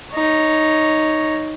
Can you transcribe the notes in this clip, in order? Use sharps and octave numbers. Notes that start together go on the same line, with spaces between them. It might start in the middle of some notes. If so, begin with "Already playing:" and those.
D#4 C#5